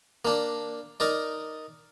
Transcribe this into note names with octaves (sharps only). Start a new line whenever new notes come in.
A#3 D4
D#4 A#4 D5